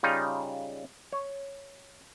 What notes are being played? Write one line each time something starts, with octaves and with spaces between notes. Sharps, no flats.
C#3 G3 D#4 F4
C#5